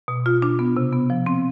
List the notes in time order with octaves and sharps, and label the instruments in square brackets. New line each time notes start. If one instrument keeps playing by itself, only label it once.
[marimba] B2
F4
D4
B3
C3
B3
F3
C4